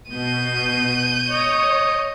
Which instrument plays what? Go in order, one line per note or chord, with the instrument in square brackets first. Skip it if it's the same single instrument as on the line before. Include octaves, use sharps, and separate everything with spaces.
[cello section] B2 [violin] G6 D#7
[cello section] C#5 [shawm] D#5